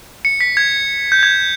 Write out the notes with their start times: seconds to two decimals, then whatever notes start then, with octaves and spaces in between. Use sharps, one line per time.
0.25 C#7
0.40 B6
0.57 G#6
1.12 G6
1.23 G#6